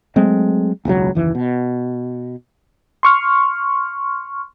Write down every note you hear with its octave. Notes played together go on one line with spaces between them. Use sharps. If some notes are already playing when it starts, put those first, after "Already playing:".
F#3 G#3 A3 C4
E1 C#2 B2 F#3
F#1 D#2 E3
B2
C6 C#6 F6